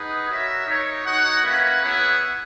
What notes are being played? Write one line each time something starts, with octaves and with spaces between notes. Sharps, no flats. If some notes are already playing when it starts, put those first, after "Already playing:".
Already playing: D#4 G#4 B4 D#5 F#5
F#4 A#4 C#5 E5
D#4 A#4 C#5
D#4 F#4 C#5 F#5
A#3 C#4 E4 B4 F#5
B3 E4 G#4 C#5 F#5